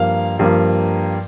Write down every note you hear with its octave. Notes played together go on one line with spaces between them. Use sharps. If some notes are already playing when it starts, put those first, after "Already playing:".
Already playing: G2 F3 A#3 F5
G2 F3 A#3